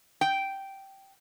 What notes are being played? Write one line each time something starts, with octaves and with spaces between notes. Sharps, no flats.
G5